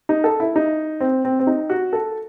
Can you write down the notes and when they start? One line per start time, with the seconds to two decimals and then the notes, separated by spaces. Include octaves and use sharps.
0.09 D#4
0.24 A4
0.40 E4
0.56 D#4
1.00 C4
1.25 C4
1.40 C4
1.47 D#4
1.70 F#4
1.93 A4